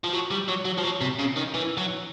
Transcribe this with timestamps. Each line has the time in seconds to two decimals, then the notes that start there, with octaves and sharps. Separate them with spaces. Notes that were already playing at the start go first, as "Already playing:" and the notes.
0.04 F3
0.13 F#3
0.31 G3
0.49 F#3
0.65 F#3
0.78 F3
0.84 F#3
1.01 C3
1.19 C#3
1.36 D#3
1.54 E3
1.77 F#3